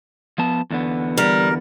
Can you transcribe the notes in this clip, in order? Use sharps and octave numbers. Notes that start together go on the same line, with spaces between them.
F3 B3 A5
E2 D3 B3
G3 A#4